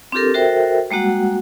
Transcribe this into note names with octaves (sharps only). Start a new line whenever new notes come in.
C4 D4 F4 G4 A4 A#4
F#4 A4 A#4 C5 E5 G5
G3 G#3 A#3 F#4 F#5